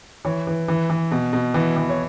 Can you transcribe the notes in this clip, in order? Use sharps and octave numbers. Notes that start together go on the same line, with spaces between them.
E3 C#5
E3
E3
E3
B2
B2
E3
E3
C#5